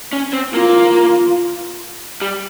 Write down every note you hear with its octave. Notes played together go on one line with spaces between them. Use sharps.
C#4
C4
A#3 F4
G3